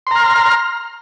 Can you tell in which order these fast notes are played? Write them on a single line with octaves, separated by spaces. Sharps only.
C6 A#5 F6